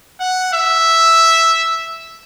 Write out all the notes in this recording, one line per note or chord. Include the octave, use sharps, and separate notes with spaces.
F#5
E5